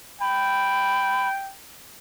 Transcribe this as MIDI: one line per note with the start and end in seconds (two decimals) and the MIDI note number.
0.21 1.51 79
0.21 1.28 83